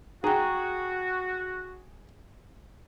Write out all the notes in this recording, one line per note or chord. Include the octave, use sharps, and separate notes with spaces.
F#4 G#4 G5 A#5